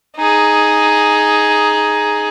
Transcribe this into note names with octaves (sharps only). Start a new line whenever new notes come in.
D#4 G#4